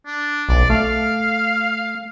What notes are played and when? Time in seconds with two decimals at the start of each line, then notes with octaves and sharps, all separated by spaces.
0.06 D4
0.49 B1 D5
0.70 A3 F5